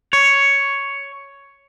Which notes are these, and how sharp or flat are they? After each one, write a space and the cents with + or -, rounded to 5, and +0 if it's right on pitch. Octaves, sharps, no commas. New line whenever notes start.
C#5 +5